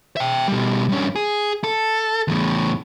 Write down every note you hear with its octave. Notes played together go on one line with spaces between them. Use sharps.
E5 G5
B2 G3
G2 C#4
G#4
A4
E2 A2